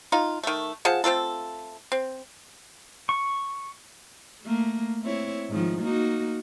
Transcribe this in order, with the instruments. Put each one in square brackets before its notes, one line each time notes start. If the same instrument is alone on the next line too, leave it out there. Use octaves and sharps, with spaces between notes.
[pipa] D#4 F4
D#3 A3
F3 G#4 F#5 A5
A3 C4 F4 A4
C4
[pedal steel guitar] C#6
[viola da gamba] A3 A#3
C4 E4 C#5
G#2 D#3 F3
A#3 D#4 F#4